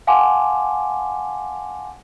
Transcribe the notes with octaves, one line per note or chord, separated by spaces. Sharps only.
F5 F#5 G#5 A5 C6 D6